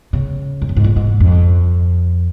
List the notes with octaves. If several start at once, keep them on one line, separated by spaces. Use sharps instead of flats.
C#3
F2
F#2
G#2
A#2
G#2
F2